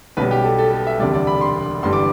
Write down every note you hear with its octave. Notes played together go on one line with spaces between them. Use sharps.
B1 B2 G3 B4
G4
A4
A4
A4
E5
E1 D2 C3 G3 D5
D5
B5
C6
G1 G2 E3 G3 C6
D6